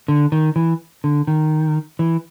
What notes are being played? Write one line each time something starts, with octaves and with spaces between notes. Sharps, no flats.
D3
D#3
E3
D3
D#3
E3